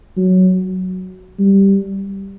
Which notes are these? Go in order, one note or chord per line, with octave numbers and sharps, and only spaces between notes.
F#3
G3